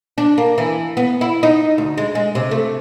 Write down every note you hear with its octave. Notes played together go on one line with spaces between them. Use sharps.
D4
A#3
E3
B3
E4
D#4
D2
G#3
G#3
C3
A3